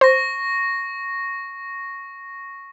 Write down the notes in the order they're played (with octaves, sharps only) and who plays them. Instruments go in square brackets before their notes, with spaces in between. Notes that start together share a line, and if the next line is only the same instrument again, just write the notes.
[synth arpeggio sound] C5 [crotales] C#6 A#6